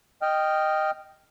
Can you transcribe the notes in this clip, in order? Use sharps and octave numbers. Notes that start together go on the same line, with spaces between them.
D#5 G5 F6